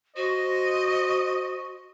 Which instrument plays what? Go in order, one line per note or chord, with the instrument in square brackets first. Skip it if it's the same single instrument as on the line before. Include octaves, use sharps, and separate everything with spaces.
[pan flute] F#4 [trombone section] C5 [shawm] D#5